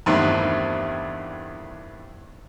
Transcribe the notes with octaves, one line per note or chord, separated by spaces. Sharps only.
E2 G2 D#3 A3 C4